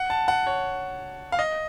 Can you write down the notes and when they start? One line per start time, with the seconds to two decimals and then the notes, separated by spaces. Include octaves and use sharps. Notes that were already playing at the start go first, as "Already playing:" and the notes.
Already playing: F#5
0.10 A5
0.28 F#5
0.47 C#5
1.32 F5
1.39 D#5